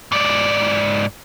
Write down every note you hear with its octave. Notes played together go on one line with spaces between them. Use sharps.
G#2 D5